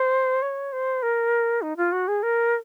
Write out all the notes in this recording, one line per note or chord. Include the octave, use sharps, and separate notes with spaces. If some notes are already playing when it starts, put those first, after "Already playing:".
Already playing: C5
C#5
C5
A#4
D#4
F4
F#4
G#4
A#4